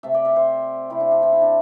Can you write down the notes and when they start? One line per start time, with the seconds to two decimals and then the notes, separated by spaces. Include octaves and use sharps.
0.03 C3 A3 E5 A5
0.14 D5 G5
0.25 E5 A5
0.36 C5 E5
0.90 C3 A3 C4 E4
1.00 D4
1.11 D4
1.22 C4 E4
1.33 E4
1.42 D4